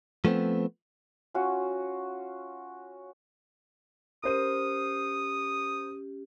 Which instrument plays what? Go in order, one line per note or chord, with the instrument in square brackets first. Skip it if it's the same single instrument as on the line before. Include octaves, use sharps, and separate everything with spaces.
[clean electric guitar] F3 A3 B3 C4
[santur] C#4 F4 F#4
[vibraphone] C#4 G4 [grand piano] A#4 C5 D#7 [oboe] D#6